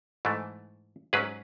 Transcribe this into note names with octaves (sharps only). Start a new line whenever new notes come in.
G#2 E3 A3
G#2 F#3 C#4 G#4 B4